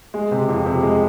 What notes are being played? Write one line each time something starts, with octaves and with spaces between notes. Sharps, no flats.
G#3
C3
F2
C3
G#3